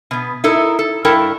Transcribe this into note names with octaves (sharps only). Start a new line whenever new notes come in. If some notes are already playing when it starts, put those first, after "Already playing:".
B2 B3
D#4 E4 A4 A#4
A4
G2 E4 A4 A#4 G5 A5